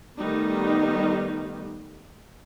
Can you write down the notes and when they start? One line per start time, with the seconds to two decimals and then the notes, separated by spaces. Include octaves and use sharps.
0.19 D#3 G3 A3 B3 D#4